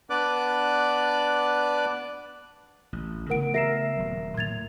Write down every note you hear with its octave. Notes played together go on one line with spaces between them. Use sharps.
B3 D4 B4 D5 D6 F#6
A1
C#3 A3 B3 A#4 F#5 D7
A#4 E5 A#6 C7 E7
D#1 F#3
A2 G#6 A6 F7